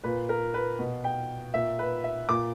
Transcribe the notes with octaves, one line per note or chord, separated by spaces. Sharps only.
A#2 B4
A#4
B4
B2
G5
A#2 E5
B4
E5
A#2 D6